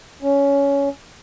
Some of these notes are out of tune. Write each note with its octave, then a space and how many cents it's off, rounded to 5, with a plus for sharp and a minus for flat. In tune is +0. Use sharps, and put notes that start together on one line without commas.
C#4 +15